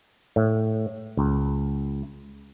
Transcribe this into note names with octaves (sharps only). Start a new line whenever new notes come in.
A2
C#2